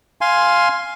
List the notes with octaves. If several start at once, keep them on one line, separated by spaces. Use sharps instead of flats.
F5 G#5 C6